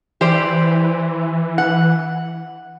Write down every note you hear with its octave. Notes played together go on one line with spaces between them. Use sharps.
E3 G4 C5 D5
F#5